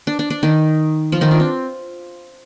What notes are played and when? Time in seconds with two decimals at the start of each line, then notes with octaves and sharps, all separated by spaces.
0.07 D4
0.19 D4
0.30 D4
0.43 D#3 D#4
1.12 F3 F4
1.21 D#3 D#4
1.31 D4
1.40 C4